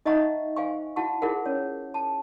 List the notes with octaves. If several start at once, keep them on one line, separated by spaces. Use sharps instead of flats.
D#4 D#5 E5 F#5 A#5 C#6
C5 F5 G#5 C#6
E4 F#4 F#5 A5 C#6
E4 F4 G#4 A#4 C5 F#5
C#4 C#5
A5